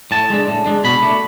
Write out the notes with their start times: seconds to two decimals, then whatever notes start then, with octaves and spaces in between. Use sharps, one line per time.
0.11 A2 A5
0.30 G#3 D4
0.48 A2
0.66 G#3 D4
0.84 B2 B5
1.02 A3 D4